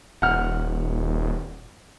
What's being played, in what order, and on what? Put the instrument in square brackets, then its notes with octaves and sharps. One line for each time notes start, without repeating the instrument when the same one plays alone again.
[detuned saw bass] D#1 [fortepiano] F#5 F6